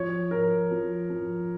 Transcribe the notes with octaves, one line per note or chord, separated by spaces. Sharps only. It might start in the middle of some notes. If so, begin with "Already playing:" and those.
Already playing: F3 C#5
F3 A#4
F3
F3